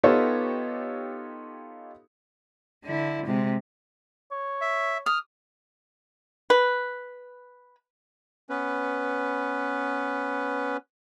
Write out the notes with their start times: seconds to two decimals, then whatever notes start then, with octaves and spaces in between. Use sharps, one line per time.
0.04 B3 D#4 F4 G4 A4 C#5
2.85 D3 E4
3.26 C3 G#3
4.32 C#5
4.61 E5
5.06 D#6 F6
6.50 B4
8.50 B3 C#4 B4